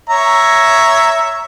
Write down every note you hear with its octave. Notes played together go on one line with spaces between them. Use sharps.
C#5 E5 A#5